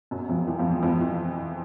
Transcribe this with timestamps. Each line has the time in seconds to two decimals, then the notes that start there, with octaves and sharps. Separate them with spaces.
0.11 F#2 F#3
0.29 F2 F3
0.47 E3
0.59 F2 F3
0.83 F2 F3
1.00 E3